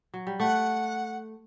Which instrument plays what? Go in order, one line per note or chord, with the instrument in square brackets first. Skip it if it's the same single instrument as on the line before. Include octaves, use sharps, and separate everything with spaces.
[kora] F#3
G3
[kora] A3 [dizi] F#5